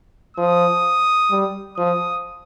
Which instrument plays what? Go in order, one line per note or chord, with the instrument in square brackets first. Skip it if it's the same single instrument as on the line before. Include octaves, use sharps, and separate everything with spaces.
[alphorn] F3 [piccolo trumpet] D#6
[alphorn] G3
[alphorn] F3 [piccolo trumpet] D#6